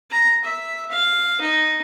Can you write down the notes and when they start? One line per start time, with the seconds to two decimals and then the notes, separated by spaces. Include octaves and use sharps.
0.11 A#5
0.44 E5
0.91 F5
1.41 D#4